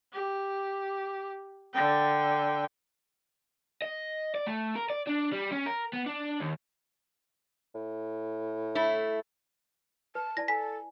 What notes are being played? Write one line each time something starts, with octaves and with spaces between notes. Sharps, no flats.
G4
D3 G5
D#5
D5
A3
A#4
D5
D4
G3
C#4
A#4
B3
D4
D#2
A2
A3 E4
B4 A5
E4 D5 A5 A#6
A4 G#5 A#5 B6